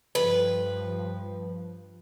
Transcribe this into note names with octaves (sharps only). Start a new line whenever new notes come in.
G2 F3 B4